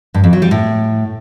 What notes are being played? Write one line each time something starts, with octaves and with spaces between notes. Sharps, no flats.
G2
F2
F#3
G3
A2